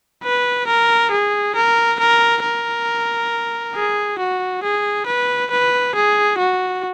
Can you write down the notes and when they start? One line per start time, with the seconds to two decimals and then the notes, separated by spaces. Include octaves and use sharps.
0.24 B4
0.68 A#4
1.12 G#4
1.56 A#4
2.00 A#4
2.43 A#4
3.75 G#4
4.19 F#4
4.63 G#4
5.07 B4
5.51 B4
5.95 G#4
6.38 F#4